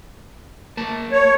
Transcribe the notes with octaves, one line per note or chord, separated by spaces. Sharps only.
A#3 A5
C#5